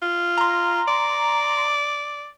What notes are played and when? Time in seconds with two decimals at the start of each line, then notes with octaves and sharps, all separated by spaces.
0.02 F4
0.38 A#5 C6
0.87 D5